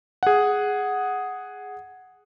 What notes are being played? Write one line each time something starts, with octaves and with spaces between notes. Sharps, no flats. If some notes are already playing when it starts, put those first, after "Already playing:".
G#4 F#5